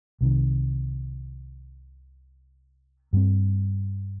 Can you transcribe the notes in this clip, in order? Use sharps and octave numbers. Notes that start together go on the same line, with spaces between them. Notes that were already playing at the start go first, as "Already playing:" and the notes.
C2 C3 D#3
G2 G3 C4